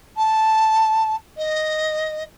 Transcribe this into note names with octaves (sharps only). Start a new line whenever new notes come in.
A5
D#5